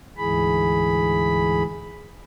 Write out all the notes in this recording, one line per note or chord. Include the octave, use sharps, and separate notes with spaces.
D2 G#2 E3 G#4 B5